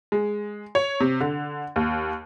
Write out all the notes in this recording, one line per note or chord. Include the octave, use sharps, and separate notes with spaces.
G#3
C#5
C3
D3
D#2